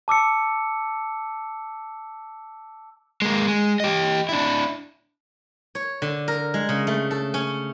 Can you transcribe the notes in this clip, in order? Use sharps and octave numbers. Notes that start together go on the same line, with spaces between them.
A5 D6 E6 C#7
G#3 A#3
G#3
G4 D#5
D4 E4
C#5
D3
A#4
G#3
C#3
A3
A4
C#4